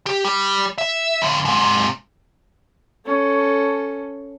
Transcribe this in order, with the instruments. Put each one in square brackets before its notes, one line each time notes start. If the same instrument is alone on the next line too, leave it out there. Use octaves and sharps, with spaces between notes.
[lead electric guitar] G4
G3
E5
F2 D3
G#2 C3
[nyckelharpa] C#4 A4